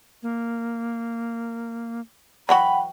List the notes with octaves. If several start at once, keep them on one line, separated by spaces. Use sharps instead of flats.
A#3
E3 F#3 F#4 F#5 G5 B5